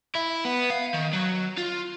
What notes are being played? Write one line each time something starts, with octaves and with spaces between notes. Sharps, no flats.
E4
B3
F5
D#3
F#3
F4